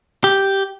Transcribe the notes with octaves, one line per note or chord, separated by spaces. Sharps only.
G4